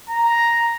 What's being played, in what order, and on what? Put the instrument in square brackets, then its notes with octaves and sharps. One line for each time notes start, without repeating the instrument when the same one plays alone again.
[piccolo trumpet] A#5